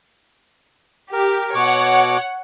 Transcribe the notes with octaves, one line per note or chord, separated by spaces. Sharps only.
G4 A#4
B2 F#4 C#5 F#5 D6